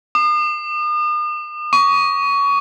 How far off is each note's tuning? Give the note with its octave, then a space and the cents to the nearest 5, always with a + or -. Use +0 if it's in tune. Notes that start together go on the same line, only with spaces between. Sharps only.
D#6 -45
C#6 +25